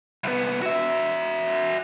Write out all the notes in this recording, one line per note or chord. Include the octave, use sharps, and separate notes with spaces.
C2 B3
F#4 E5